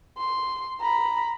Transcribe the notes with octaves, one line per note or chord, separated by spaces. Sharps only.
C6
A#5 B5